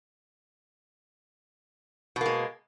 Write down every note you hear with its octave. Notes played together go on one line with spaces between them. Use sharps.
B2 G#3 A#3